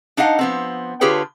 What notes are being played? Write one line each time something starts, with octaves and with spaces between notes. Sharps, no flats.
D4 D#4 D#5 F5 F#5
F3 B3 C4
D3 F4 G4 G#4 B4 C#5